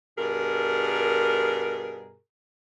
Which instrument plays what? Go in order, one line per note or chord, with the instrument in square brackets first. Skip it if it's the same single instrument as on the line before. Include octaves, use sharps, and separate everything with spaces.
[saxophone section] G2 B2 G#4 A#4